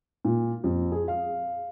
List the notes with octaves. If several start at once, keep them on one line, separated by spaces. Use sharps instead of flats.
A#2
F2
G#4
F5